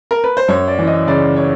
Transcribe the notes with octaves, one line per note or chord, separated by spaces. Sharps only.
A#4
B4
C5
F#2 C#5
D5
E3
D#5
C#3 D5
C#5